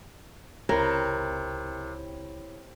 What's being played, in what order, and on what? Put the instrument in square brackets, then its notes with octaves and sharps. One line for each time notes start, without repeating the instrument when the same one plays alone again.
[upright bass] C#2 [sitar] C3 [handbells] E4 C#5 [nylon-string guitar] A#4